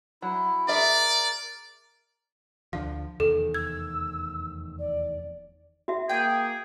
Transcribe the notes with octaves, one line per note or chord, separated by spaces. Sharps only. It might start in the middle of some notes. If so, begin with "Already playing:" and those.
F#3 E4
G#4 A#4 D5 E5
D2 D3 F3 F5
F1 E2 D#3 A4
E6 G#6
D5
F#4 E5
A#3 G#4 G5